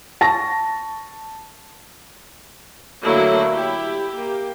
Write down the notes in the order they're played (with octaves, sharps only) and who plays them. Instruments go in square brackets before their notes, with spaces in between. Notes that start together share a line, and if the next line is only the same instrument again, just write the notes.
[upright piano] A5 C#6 A#6
[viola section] D3 F#3 A3 A#3 D4 E4
E4 G4
A#3 G4